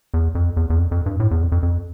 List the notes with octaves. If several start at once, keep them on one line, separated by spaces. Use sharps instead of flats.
E2
F2
E2
E2
F2
F2
G2
A2
E2
F2
F2
F2